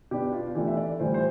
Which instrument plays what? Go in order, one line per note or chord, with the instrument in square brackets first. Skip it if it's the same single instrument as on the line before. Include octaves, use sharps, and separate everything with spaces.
[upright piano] B2 B3 D4 G4
F4
E3 A3 D4 G4
E5
D5
A2 E3 G3 C5
C5